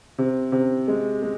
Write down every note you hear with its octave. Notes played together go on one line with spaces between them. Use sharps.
C3
C3
G#3
G#3